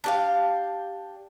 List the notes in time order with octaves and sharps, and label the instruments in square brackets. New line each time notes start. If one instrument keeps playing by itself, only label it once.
[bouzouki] D4 G4 F5